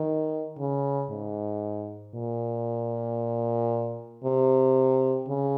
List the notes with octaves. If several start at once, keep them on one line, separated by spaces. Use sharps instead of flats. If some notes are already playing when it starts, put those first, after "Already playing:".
Already playing: D#3
C#3
G#2
A#2
C3
C#3